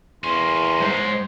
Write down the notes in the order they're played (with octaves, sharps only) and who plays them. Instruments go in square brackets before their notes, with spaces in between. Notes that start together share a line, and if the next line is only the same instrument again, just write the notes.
[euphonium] E2 [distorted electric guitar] A#3 C#4 [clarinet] C6
[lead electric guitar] G#2 C5